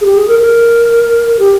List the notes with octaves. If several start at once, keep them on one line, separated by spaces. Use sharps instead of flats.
G#4
G4
G#4
A#4
A#4
G4